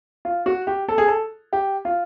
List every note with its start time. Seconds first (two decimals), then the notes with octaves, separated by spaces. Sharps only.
0.25 F4
0.46 F#4
0.67 G4
0.88 A4
0.98 G#4
1.08 A4
1.53 G4
1.85 F4